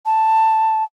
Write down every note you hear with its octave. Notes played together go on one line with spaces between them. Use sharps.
A5